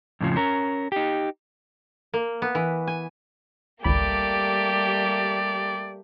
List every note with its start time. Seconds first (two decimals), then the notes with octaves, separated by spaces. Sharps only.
0.21 F2 A2 C#3 F3
0.36 C#4 A#4
0.92 D#4 G4
2.13 A#3
2.42 B3
2.55 E3
2.87 G#5
3.84 G#1 C#2 G3 A3 A#3 G4 D5 B5